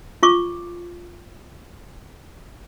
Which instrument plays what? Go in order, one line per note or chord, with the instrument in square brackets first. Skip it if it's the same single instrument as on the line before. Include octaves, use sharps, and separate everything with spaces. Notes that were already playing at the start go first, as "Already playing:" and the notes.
[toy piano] F4 C#6 D6